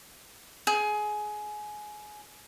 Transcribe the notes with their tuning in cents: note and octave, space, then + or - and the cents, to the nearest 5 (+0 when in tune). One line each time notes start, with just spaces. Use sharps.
G#4 +20